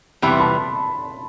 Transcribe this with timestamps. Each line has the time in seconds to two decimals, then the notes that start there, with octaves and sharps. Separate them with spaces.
0.22 C3 E3 G3 B3 B5
0.31 C6
0.40 A5 B5